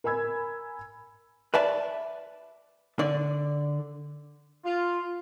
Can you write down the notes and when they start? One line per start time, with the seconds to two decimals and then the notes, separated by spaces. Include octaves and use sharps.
0.04 A#4 G#5 B5 E6 G#6
1.54 B4 D5 E5 A5
2.99 D3 D5
4.65 F4